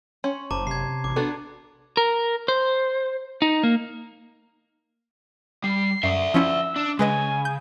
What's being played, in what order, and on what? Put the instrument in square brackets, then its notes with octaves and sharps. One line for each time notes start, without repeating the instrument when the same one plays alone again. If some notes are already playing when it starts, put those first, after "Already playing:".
[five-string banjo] C#4 C#5 [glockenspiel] C6
[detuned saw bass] F#1 [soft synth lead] C5 [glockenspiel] A5 A#5 D6
[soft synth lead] C3 [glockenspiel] G#6 C7
[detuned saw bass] A1 [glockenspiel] D6
[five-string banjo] B3 F#4 A4 [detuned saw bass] D4
[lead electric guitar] A#4
C5
D#4
A#3
[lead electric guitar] G3 [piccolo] C7
[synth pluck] F#2 [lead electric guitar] D5 E5
[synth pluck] F3 C#4 E4 [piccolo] E6
[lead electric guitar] D4
[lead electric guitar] C#3 [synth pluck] G#3 B4 D#5 [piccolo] G#5
[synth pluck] G6